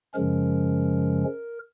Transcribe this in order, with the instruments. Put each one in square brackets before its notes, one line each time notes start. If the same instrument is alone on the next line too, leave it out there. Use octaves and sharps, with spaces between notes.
[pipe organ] F#2 C#3 F3 G#3 C#4 A#4